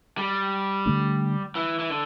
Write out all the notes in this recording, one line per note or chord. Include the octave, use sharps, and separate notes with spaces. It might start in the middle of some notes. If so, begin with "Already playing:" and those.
G3
D3 A3 D4
E3
E3
D3